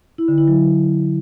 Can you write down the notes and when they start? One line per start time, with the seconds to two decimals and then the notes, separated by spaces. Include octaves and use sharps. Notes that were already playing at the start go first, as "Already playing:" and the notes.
0.18 E4
0.28 D3
0.38 E4
0.48 F#3